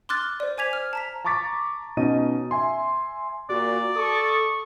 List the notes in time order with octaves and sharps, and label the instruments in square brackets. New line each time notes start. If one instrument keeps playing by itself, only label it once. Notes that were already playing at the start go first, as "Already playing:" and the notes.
[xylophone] C6 D6 F6 F#6 A6
D6
C5 D5
C5 G#5 D6 G#6 B6 F7
F6
A5 A#5 B6
[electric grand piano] A5 A#5 C#6 D6 A6 B6
B2 C#4 D#4 D#5 D#7
E5 G#5 C6
[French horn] A#2 [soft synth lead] F#4 [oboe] D5
[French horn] A4 [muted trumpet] C#6 [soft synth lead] D#6